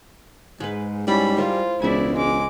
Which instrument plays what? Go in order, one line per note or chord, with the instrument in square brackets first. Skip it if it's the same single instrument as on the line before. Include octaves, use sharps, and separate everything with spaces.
[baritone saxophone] G#2 [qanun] G#3 B4
[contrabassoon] G#2 [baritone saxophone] G3 [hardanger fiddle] C#4 B5 [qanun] E4 D5
[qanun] G#3 A#4 C5 [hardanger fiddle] F4
[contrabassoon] E1 [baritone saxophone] C#2 [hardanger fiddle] E4 D5 [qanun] E5 G#5
[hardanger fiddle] G#3 D6